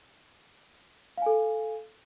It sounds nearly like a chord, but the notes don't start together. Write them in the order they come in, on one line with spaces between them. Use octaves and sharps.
F5 G#5 A4